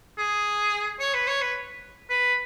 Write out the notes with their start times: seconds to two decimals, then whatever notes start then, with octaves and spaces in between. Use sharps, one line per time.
0.18 G#4
0.99 C#5
1.14 B4
1.28 C#5
1.41 B4
2.10 B4